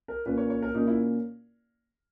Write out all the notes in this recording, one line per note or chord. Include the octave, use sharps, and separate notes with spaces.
A#4
A#2 A#3 C#4 B4
C#5
C#5
A#4
A#2 A#3 C#4 D#4
E4